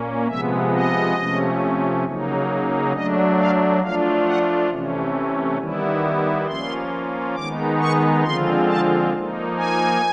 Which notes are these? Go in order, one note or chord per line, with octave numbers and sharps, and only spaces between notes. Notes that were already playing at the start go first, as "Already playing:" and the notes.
Already playing: A#2 A#3 C#4
C3 F3 G#3 B3 E5
D#5
C3 F3 A3 C#4
C#3 F#3 A#3 D#4
F#3 A3 D4 D#5
F5
F3 A3 D4 F4 F5
F#5
C3 E3 A3 C#4
D#3 G3 B3 E4
F3 A#3 C#4 F4 C6
D#3 G#3 B3 D#4 D6
C#6
D3 F3 G#3 C4 F4 C6
A5
F3 A#3 D#4
G#5